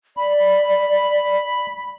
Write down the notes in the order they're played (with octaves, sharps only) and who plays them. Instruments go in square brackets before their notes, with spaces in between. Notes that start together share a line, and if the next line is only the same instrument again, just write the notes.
[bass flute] D5 [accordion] B5